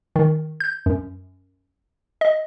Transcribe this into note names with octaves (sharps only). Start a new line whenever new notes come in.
D#3
G6
F#2
D#5